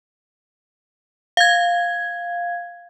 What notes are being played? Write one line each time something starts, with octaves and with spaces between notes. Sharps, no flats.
F5 G#6